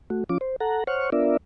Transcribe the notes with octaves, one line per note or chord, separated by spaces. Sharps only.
A3 F#4
F3 C#4 F4 D6
C5
A4 F#5 A#5
C5 C#5 F#5 C#6 F6
B3 D4 F4 A#4 D5 E5